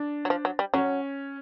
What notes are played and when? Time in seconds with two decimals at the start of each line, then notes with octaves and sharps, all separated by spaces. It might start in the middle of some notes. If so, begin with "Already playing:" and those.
Already playing: D4
0.25 F#3
0.30 F3
0.45 F#3
0.59 G3
0.74 F#3 C#4